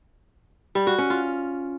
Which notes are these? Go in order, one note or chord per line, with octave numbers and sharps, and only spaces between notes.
G3
F#4
C#4
F4